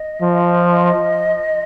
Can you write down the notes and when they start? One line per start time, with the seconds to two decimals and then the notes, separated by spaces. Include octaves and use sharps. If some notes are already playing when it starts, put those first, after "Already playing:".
Already playing: D#5
0.22 F3
0.71 D#5